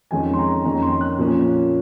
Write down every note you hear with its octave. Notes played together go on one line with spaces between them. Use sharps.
F2 D#3 G#3 C#4 G#5
C6
A#5
F2 D#3 A#3 C#4 A#5
C6
F#6
A#2 F3 A#3 C#4